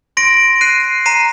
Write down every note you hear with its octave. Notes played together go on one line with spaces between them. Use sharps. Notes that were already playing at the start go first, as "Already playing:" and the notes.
C6 A#6 D7
F#6 C7 D#7
A#5 C7 D#7